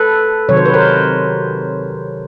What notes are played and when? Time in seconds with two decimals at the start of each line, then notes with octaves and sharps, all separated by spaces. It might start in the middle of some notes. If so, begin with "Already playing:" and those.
Already playing: A4 B4
0.49 C3 D#3 F#3 C#5
0.57 C5
0.66 B4
0.74 A#4 C5